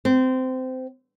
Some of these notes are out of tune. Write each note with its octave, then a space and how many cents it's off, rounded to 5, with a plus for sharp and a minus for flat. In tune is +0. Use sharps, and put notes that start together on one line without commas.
C4 -20